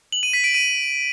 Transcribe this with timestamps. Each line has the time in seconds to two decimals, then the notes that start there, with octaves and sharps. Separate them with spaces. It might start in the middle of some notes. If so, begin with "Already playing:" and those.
0.12 F#7
0.23 D#7
0.33 B6
0.44 D7
0.54 D#7